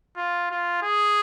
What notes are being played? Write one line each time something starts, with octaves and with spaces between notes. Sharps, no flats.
F4
F4
G#4